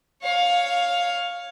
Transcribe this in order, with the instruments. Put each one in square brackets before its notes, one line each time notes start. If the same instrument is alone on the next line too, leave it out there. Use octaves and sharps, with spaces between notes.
[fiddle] C#5 F5